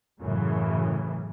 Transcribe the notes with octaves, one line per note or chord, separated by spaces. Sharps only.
F#2 A2 C#3 E3